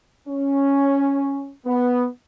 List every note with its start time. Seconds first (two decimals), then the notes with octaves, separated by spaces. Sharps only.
0.28 C#4
1.65 B3